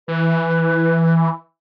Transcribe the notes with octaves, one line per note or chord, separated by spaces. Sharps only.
E3 B4